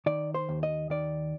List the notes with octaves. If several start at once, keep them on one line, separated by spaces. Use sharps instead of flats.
D#3 D5
C5
D#2
D#5
D#3 D5